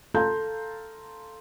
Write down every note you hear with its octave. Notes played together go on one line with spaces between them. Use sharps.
A4 F5 A5 A#5 C6 G6